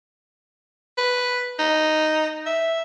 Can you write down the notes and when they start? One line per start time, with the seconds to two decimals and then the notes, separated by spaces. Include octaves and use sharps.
0.98 B4
1.59 D#4
2.46 E5